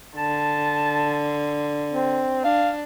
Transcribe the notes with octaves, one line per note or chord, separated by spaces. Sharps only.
D3 A5
C4
D4 F5